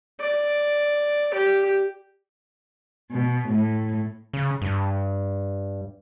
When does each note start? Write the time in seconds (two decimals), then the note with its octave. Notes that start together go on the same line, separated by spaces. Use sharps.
0.20 D5
1.34 G4
3.10 B2
3.49 A2
4.33 C#3
4.62 G2